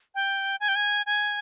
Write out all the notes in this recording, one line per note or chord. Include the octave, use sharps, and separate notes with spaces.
G5
G#5
G5
G#5
G#5